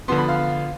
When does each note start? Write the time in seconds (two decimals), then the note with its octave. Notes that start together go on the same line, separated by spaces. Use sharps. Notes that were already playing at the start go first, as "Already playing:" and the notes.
0.08 D3 F3 B3 C6
0.18 B5
0.28 F5